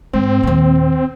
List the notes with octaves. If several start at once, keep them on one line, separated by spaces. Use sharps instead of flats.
G#2 C4
D#2 A#2